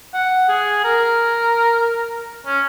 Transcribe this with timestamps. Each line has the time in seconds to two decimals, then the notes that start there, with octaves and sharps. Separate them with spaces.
0.14 F#5
0.49 G#4
0.84 A#4
2.47 C#4